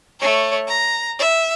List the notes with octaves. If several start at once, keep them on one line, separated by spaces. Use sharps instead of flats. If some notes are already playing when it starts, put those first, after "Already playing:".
A3 C#5
A#5
E5